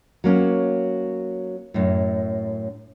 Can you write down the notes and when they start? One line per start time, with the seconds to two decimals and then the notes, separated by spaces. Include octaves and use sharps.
0.24 F#3 A#3 C#4
1.74 F#2 A2